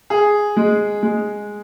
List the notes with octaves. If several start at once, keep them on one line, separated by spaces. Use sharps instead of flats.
G#4
G#3
G#3